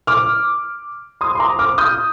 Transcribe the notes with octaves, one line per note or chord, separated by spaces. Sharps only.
D6 F6
C6 D#6
C6
A#5 D6
D6 F6
D#6 G6